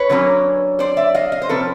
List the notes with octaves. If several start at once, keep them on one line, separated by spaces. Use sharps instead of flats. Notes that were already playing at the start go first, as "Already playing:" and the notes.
Already playing: B4 C#5
D3 F#3 A#3 C#4
C5 D5
D5 E5
D#5 F5
D#5 F5
C5
C3 F3 A#3 C#4 A4 B4